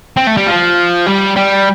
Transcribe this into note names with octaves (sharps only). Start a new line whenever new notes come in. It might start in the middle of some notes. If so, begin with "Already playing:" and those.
C4
A3
G3
F3
G3
G3